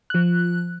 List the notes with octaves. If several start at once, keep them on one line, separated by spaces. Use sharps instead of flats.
F3 F#6